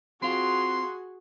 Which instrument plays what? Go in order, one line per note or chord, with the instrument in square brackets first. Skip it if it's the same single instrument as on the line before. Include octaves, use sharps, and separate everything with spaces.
[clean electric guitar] C4 F4 [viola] F#4 G#4 [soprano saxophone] C6